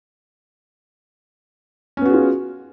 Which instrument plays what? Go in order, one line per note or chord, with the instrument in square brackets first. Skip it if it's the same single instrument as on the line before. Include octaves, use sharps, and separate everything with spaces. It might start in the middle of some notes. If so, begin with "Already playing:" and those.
[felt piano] C#4
B3
F#4
G#4
F4